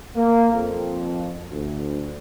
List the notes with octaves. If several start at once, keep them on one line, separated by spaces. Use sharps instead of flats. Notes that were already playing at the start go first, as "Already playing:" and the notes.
A#3
F2
D2